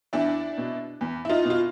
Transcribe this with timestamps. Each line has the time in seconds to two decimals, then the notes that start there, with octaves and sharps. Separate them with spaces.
0.13 E2 D4 E4
0.57 B2
1.01 E2
1.25 E4
1.29 D#4 F4
1.45 B2
1.50 F4